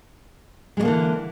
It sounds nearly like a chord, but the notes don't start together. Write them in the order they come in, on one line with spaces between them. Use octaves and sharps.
G#3 G3 A#3 D3 E3